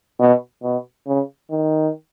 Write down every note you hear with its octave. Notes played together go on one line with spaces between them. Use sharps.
B2
B2
C#3
D#3